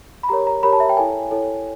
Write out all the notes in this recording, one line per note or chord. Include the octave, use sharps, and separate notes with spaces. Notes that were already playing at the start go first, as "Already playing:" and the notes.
B5
G4 A#4 C#5 A#5
A#5
G4 A#4 C#5 B5
A5
E5
G5
E4 A4 C#5 G#5
E4 A4 C#5